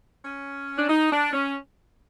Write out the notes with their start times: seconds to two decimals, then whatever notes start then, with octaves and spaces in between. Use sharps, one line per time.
0.24 C#4
0.78 D4
0.89 D#4
1.11 D4
1.32 C#4